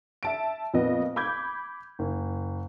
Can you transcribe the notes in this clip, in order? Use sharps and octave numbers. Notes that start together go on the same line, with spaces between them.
E5 A5 D7
F2 A#2 B3 D#5
B5 D6 G6 G#6
F#1